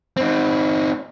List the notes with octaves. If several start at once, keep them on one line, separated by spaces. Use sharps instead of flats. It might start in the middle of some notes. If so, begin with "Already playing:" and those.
C4 D#4